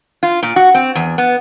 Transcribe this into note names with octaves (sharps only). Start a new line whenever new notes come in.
F4
A#2
F#4
C4
E2
B3